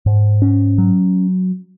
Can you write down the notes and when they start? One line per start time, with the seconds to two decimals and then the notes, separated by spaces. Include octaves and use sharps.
0.06 G#2
0.42 C#4
0.78 F#3